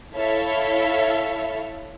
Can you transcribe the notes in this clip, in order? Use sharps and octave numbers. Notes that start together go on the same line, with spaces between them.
E4 A4 C#5 E5 F5